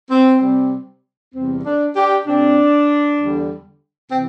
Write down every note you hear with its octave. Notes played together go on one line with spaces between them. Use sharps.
C4
C3 G3 C4
E2 C3 G3 C4
D4
D4 G4
C3 A3 C4 D4
E2 D3 G3
C3 E3 C4